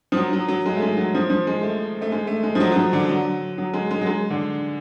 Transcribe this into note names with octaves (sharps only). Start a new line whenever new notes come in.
F3
F#3
F#3
F#3
G#3
A3
G#3
F#3
F3
F3
G#3
A3
A3
G#3
A3
G#3
F3
F#3
F#3
F3
D3
F#3
F#3
G#3
G#3
F#3
G#3
D3